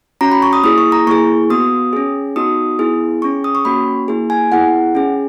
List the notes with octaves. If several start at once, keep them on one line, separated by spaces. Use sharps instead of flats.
C#4 F#4 A#5
B5
C#6
D#6
A#3 E4 G#4 D#6
C#6
A#5
A#3 E4 G#4 C#6
B3 F#4 D#6
C#4 G#4
B3 D#4 F#4 D#6
B3 E4 G#4
C#4 G#4 C#6
D#6
C#6
A#3 C#4 F#4 B5
A#3 E4 G#4
G#5
B3 E4 G#4 F#5
C#4 G#4